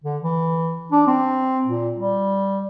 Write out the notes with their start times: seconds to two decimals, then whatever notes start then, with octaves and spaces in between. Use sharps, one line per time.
0.04 D3
0.22 E3
0.92 D4
1.07 C4
1.66 A#2
1.97 G3